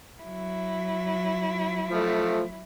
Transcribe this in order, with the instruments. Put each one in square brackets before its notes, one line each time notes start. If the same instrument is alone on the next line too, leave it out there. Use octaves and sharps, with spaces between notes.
[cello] F#3 E4
[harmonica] F3 A3